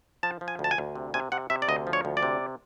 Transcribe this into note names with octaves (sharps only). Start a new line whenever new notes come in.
F3 A5
F3
G#5
D2
A5
G#5
D2
C3
C3 G#5
C3 F#5
C3 E5
D5
D2 D#5
F3
C#5
D2
D5
C3